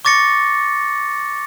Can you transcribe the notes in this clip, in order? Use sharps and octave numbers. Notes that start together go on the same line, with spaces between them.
C#6 D6 A6 A#6 C#7